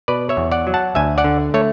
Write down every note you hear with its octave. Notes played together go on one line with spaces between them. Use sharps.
B2 B4 D5
C#5 E5
E2
D5 F#5
F#3
F#5 A5
D2 E5 G#5
D5 F#5
D3
A3 C#5